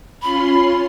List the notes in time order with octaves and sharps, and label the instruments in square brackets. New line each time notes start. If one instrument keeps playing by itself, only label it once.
[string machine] C#4 F4 C6 [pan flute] B5